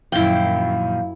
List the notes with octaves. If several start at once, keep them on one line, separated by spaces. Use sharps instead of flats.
F#2 A#2 D#3 F3 E4 F5 G5